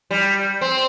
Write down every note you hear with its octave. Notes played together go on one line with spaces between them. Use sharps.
G3
C4